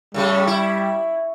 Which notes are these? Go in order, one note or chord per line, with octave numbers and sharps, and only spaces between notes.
A2 C#3 G3 A3
E4